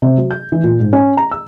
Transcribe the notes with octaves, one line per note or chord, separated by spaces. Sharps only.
C3
F#3
G6
E3
A#2
G#2
C#4
A#5
E6